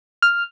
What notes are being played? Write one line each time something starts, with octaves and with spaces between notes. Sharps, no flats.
F6